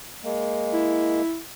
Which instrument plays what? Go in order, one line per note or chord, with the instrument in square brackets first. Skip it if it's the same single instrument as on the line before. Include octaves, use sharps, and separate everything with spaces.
[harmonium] G#3 A#3
[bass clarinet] E4